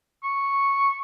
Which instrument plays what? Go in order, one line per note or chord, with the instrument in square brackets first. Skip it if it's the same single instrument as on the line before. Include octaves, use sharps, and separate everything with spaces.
[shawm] C#6